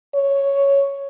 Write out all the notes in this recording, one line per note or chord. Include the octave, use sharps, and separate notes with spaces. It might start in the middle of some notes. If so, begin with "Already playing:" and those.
C#5